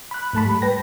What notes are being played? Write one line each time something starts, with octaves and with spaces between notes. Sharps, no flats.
B5 F#6
G#2 A3 A5 B5
G3
B4 G5 A#6